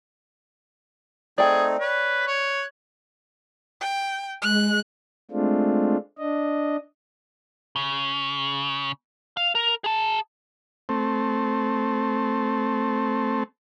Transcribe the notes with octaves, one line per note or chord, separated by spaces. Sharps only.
A3 C4 D#4 G#4 D5 G5
B4 C#5
C#5 F#6
G5
G#3 F#6
G#3 A3 C4 D4 F4
D4 D#5
C#3
F5
A#4
G#4 A5
A3 C4